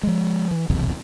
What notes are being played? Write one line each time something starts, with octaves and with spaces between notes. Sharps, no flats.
F3 G#3
E3
D#1 B1 E2 C3